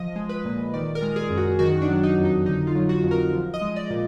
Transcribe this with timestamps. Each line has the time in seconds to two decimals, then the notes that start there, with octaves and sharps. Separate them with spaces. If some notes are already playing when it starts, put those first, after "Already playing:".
Already playing: F3 D#5
0.16 G#3
0.29 B4
0.45 A#2
0.74 D#3 D5
0.95 A#4
1.02 G#3
1.16 G#4
1.30 F#2
1.37 F#4
1.59 D#3 F#4
1.82 D4
1.89 F#3
2.03 D#4
2.18 F2
2.25 D#4
2.46 D3 D#4
2.67 F4
2.75 F#3
2.89 F#4
3.03 F2
3.11 A#4
3.32 F3
3.54 D#5
3.61 G#3
3.76 D5
3.90 A#2